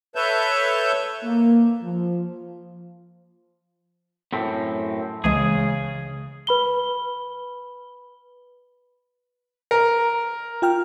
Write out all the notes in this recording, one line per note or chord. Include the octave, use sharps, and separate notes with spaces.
A4 B4 C#5 E5 A5 G6
A#3
F3
F#2 A2 C4
C#2 C#3 E3 G#3 G#4
B4 B5 G7
A#4
F4 G5 F6